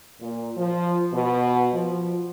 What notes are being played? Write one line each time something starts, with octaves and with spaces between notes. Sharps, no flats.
A#2
F3
B2
F3